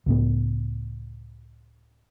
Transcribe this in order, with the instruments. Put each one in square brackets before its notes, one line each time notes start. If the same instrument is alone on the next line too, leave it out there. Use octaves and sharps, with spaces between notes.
[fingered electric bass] C#2 A2 B3